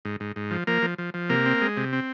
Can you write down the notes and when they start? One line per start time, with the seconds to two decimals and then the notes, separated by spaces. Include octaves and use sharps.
0.05 G#2
0.20 G#2
0.36 G#2
0.51 F3
0.67 F3 A#3 A#4
0.82 F3
0.98 F3
1.14 F3
1.29 C3 A#3 A#4
1.46 C4
1.61 G#3
1.77 C3
1.93 C4